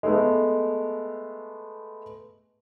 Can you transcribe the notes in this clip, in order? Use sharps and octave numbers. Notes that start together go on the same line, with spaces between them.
G#3 A3 B3